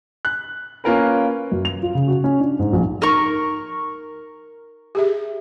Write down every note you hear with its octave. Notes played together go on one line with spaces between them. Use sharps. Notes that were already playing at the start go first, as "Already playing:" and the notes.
F#6
A#3 C#4 F4 A#4 B4
F#2
F7
F4
C#3
F#4
C#4
D4
G#2
A#1
D#4 A#4 C#6
G4 G#4 E5